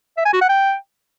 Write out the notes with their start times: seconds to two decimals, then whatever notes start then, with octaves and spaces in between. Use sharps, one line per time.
0.17 E5
0.25 G#5
0.33 F#4
0.41 F#5
0.49 G5